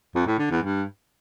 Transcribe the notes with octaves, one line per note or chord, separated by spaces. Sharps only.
F2
A2
D3
E2
G2